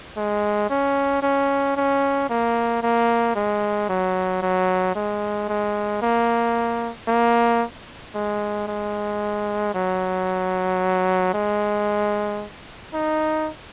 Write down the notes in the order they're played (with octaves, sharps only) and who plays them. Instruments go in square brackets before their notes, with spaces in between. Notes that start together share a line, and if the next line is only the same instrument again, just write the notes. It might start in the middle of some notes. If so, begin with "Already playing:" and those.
[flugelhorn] G#3
C#4
C#4
C#4
A#3
A#3
G#3
F#3
F#3
G#3
G#3
A#3
A#3
G#3
G#3
F#3
G#3
D#4